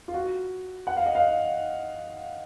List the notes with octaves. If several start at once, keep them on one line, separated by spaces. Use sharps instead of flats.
F4
F#4
F#5
F5
D#5
F5